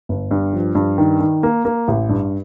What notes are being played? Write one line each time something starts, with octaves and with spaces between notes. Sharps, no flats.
G1
G2
F3
G2
D#3
D#3
A#3
A#3
A1
G2